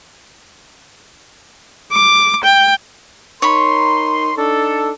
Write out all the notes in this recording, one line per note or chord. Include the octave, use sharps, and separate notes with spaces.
D6
G5
D#4 A#4 C#5 B5 C6
D4 D#4 A4